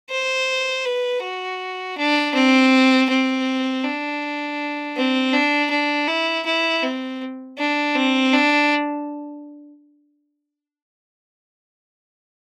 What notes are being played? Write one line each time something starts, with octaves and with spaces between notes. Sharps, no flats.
C5
B4
F#4
D4
C4
C4
D4
C4
D4
D4
E4
E4
C4
D4
C4
D4